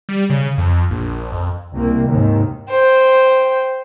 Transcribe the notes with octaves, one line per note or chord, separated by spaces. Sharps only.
G3
C#3
F2
A#1
F2
C2 A#3 C4
D#2 G#2 C3 D#3
C5 G5